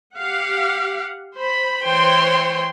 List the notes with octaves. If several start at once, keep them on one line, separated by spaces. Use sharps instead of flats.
G4 F5 F#5
C5 B5
E3 C5 C#5 G5 C6